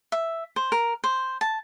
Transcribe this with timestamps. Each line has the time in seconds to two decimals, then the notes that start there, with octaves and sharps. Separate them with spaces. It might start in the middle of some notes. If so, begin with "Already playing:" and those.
0.12 E5
0.56 C5
0.72 A#4
1.04 C5
1.41 A5